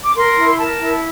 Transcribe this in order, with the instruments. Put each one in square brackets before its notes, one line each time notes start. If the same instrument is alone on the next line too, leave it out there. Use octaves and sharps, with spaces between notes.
[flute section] D6
A#4 C6
E4
A#4 A5
E4